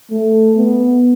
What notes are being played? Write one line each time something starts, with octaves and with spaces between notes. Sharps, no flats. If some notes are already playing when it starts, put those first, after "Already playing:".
A3
B3